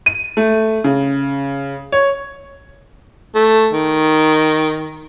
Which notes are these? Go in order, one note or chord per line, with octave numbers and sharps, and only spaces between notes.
D#7
A3
C#3
C#5
A3
D#3